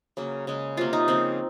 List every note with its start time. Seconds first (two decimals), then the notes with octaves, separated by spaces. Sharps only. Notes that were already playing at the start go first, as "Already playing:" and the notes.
0.17 C#3 F#3 A#3
0.47 C#3 G#3
0.77 C3 F#3 A#3 F4
0.93 D#4
1.08 C#3 F3 A#3 C4